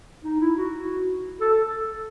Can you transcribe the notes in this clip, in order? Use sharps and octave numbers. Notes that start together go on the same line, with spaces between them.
D#4
E4
F#4
A4